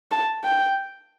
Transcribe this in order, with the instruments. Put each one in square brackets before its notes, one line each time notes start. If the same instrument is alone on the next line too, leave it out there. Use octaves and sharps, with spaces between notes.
[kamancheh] A5
G5